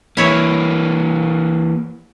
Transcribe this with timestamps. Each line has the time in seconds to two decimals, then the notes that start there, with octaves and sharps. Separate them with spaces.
0.17 E3 A#3 E4 C#5 E5